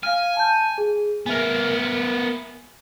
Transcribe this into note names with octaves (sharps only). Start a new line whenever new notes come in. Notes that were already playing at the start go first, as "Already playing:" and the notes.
F5 G#5 F6
A5 G6
G#4
B3 A#4 E5 G#5